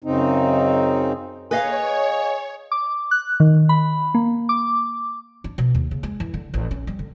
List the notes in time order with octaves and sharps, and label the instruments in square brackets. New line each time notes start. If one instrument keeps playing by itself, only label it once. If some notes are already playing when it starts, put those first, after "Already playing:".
[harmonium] F#2 C#3 C4 D#4
[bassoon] G#4 [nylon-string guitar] B4 D#5 F5 [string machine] C#5
[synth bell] D6
F#6
D#3
B5
A#3
D6
[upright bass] D4
B2
D#2
C#3
G#3
E3
D3
A1
C#4
G3
D3